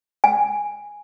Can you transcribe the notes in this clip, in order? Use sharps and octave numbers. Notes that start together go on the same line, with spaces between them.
G#5